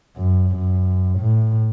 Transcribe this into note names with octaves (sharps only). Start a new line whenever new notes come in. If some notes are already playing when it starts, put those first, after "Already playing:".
F#2
F#2
A2